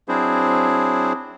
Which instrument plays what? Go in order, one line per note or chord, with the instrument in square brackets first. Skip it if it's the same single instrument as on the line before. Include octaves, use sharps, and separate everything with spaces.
[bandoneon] F#3 C4 D4 E4 G#4 C5